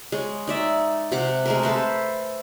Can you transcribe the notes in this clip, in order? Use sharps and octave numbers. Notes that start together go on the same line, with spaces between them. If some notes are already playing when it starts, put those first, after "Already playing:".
G#3 C#5
D#4 D5 E5
C3 F#5 D6
G#3 A3 A#4
A4 B4 C5